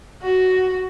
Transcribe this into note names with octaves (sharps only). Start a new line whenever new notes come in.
F#4